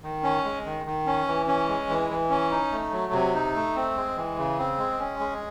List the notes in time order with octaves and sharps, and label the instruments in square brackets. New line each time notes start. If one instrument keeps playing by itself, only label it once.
[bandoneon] D#3
C#4
G#3
D#3
D#3
C#4
E3
C#4
G#3
E3
E3
C#4
D#4
A3
F#3
C3
D#4
A3
C4
G#3
E3
C#3
C4
G#3
C#4
G#3